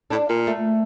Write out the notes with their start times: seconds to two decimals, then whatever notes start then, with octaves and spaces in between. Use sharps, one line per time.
0.10 A2 D4
0.29 A#2 A#3
0.47 A3